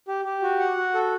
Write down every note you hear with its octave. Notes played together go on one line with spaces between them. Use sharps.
G4
G4
F#4
F#5
F#4
A4